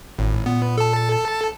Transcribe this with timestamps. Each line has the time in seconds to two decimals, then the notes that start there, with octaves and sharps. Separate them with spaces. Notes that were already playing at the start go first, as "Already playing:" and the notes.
0.19 G#1 A2
0.46 A#2 B3
0.78 A4 A5